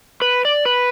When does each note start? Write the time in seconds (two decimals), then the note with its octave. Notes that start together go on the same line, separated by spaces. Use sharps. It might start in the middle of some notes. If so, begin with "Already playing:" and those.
0.22 B4
0.45 D5
0.65 B4